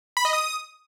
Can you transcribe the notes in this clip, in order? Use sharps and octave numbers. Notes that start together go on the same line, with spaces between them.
B5
D#5
D#6